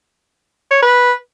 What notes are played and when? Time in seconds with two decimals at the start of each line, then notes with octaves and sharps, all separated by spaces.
0.71 C#5
0.82 B4